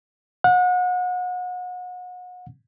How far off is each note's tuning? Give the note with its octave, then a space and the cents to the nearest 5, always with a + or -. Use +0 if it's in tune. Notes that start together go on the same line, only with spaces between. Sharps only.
F#5 -35